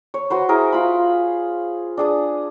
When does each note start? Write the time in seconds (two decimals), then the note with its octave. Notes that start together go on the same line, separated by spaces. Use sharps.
0.14 C#5
0.30 F#4 B4 C5
0.49 E4 G#4 A#4
0.72 F4 B5
1.98 D4 G#4 D#6